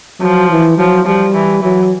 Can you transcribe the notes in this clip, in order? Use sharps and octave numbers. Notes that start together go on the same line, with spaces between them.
F3 F#3
E3
F3 F#3
F3 G3
E3
E3 F#3